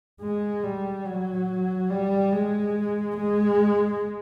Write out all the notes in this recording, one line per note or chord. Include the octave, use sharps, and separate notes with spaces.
G#3
G3
F#3
G3
G#3
G#3